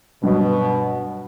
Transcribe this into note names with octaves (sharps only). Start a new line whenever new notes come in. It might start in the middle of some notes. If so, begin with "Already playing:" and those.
G2 B2 F#3